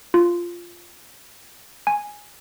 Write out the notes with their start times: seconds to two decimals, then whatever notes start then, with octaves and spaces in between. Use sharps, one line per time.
0.14 F4
1.87 G#5